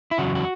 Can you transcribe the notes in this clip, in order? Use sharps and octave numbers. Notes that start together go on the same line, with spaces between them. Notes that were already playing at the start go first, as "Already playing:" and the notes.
E4
E2 C#3 F#3 F#4
F#4